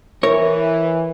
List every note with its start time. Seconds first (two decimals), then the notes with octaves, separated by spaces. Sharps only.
0.23 E3 A#4 C#5